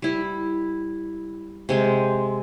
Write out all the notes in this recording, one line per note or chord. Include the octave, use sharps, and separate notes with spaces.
G3 E4
C3 G#3 C4